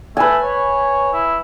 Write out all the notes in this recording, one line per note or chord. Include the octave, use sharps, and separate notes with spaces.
A3 B4 G#5
C#5
E4